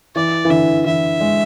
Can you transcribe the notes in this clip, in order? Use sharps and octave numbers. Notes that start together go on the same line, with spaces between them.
E3 D5
E3
D3 E5
E3 E5
G#3